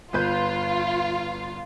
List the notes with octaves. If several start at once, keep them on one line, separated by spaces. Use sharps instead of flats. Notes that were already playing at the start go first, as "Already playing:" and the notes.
G1 F4 B4 G6